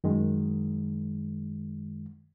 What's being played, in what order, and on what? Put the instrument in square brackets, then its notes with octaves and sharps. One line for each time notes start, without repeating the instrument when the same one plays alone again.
[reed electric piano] F#2 D#3 G#3